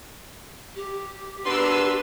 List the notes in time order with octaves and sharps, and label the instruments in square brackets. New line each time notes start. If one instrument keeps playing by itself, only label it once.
[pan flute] G4
[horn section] B2 B3 D4 [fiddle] A#4 B4 [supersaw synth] C6 E6